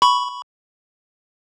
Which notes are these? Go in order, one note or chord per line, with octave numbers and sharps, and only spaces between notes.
B5 C#6